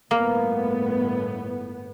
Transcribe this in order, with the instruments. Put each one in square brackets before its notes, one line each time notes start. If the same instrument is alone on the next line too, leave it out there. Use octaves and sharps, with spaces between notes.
[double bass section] G1 A2 B3 [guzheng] A#3